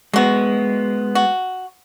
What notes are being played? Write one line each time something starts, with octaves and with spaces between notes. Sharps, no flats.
F#3 G#3 B3 F#4
F#4